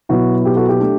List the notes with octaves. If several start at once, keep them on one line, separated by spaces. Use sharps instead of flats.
B2 F#3 B3 E4 F#4
G4
F#4 A4
G4
A3 D4